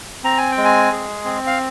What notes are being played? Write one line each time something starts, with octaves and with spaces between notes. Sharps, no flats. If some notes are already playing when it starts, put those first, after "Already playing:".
C4 A#5
G#5
G5
G#3
G#5
G#4
C4
F5